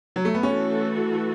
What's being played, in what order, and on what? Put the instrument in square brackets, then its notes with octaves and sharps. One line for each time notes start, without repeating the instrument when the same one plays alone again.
[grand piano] F#3
A3
B3
[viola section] E3 A3 F#4 A4 [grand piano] C#4